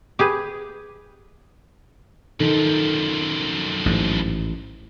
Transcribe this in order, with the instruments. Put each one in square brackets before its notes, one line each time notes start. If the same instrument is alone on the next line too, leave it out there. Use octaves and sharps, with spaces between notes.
[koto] G4 G#4 B4
[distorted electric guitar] F#2 F3 [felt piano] D#3 D#4 A4
[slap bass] A1 G#2